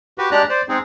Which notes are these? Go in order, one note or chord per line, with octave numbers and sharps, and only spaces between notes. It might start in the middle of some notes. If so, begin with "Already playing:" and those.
F#4 G4 B4
G#3 D4 G4 D5 A#5 F#6
C5 D5
G#3 C4 D#4 G#4